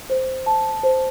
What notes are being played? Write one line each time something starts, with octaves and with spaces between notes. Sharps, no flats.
C5
A5
C5